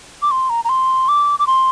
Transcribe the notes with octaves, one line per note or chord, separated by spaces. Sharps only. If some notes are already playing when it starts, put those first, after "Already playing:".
D6
C6
A#5
A#5
C6
D6
D6
C6